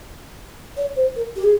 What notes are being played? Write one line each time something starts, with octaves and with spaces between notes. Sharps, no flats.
C#5
C5
A#4
G4
G#4